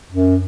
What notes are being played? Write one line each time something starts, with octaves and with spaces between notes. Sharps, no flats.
F#2